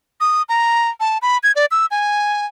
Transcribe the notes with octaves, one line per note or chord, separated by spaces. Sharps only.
D#6
A#5
A5
B5
G#6
D5
E6
G#5